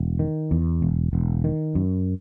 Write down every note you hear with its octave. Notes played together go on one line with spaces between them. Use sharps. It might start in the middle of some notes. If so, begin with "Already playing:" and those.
Already playing: E1
D#3
E2
E1
E1
D#3
F#2